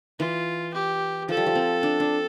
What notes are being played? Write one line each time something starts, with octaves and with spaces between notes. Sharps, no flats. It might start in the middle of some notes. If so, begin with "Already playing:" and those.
E3 F4
G4
F3 A4
G3
F3
C4
D4
D4